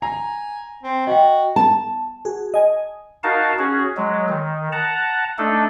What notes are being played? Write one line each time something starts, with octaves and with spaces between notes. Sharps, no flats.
G#5 A#5
C4
F#4 D#5 G5
A5
F#4 G#4
D#5 G#5
D#4 F#4 A#4 F5 A5
C#4 F#4 G#4
F#3 G#3
D#3
F#5 A5 A#5
A3 D4 D#4 A4